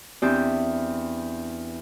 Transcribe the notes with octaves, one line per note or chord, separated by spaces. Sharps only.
E2 C4 D4 G4 D5 G6